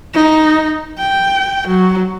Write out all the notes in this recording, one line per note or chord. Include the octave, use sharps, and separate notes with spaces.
D#4
G5
F#3